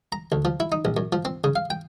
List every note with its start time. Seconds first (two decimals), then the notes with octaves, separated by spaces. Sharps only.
0.12 A#5
0.32 D2
0.45 F3
0.60 E4
0.72 D#4
0.85 A#1
0.97 F#2
1.13 F3
1.25 C4
1.44 C#3
1.56 F5
1.70 G5